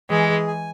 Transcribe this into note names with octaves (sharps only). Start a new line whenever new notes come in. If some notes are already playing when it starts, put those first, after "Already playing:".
E3 G#3 G#4
G#4
G#5